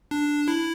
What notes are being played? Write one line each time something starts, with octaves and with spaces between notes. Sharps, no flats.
D4
E4